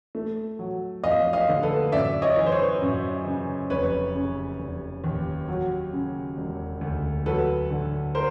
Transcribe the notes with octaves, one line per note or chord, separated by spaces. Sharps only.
A3
F#3
F2 D#5 F5
D#5 F5
D3
A4 B4
F#2 D5 E5
C#5 D#5
E3
C5
B4 C#5
F#2
C#3
F1 B4 C#5
C#3
F1
D#2
F#3
C#3
E1
D2
F#3 A4 B4
D3
A#4 C5